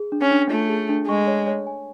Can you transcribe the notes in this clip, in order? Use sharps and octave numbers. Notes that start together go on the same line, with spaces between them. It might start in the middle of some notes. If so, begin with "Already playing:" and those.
Already playing: G#4
D4
C#4
D4
A3 F4
G#4
D4
G#3 C#6
C#5
C#5
G#5